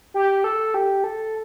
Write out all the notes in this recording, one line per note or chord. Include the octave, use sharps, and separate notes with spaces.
G4
A4
G4
A4